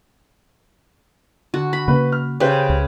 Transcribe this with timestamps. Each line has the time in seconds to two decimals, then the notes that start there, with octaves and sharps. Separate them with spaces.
1.54 D3 F#4
1.73 B5
1.88 C#3 A#3 C#4 B4
2.12 F6
2.40 C#3 C#4 G4 B4 C5 G5
2.69 C#2